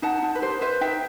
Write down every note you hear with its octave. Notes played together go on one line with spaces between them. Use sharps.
D#4 F#5 A5
D#4
B4
G4 C5
B4 C5 E5
D#4 E5 G5